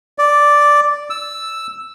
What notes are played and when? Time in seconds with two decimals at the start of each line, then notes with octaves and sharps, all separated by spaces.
0.18 D5
1.10 E6